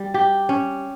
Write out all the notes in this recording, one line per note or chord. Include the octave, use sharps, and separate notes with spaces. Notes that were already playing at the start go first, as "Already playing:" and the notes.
Already playing: G3
G4
C#4